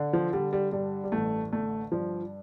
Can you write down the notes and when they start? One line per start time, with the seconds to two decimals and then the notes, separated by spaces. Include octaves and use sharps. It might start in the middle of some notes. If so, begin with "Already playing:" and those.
Already playing: D3
0.13 F3
0.33 D3 G3
0.53 G3
0.72 G2 G3
1.04 G3
1.12 A1 A3
1.52 D3 A3
1.92 G2 F3